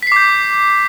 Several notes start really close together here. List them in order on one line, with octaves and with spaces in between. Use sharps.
B6 C7 D6 G6